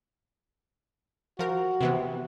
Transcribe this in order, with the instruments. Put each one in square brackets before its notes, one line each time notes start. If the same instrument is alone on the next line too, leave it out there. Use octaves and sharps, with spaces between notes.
[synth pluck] F3 A#4 [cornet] F#4
[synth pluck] C3 E3 B3